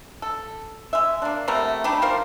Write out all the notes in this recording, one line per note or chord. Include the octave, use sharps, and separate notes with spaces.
A4
G#3 E5
A#3 D4
C3 A3 B3 A#4
G3 D4 D#4 G4
F3 A#3 A#4 C5